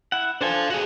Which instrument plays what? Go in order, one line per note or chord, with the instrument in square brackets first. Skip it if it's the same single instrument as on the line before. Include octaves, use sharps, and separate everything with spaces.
[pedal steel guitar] E4 F#5
[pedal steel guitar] D4 A4 G#5 [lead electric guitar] C5 F5
[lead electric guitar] F#4 G#4